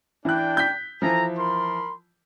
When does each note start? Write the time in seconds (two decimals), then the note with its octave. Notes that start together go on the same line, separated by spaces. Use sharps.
0.25 E3 D4 G5 F#6
0.57 G6 B6
1.02 E3 F3 A4 G#5 A#5
1.37 A#4 B5 C6